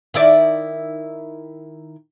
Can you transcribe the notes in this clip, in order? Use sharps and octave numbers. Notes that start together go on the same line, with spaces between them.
D#3 E4 D5